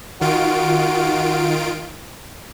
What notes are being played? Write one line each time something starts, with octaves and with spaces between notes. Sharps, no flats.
D#3 F4 F#4 D7